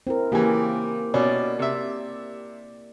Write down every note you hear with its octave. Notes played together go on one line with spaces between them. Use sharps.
C4 E4 A#4
C#3 E3 A#3 G4
B2 C#4 D5
C3 E5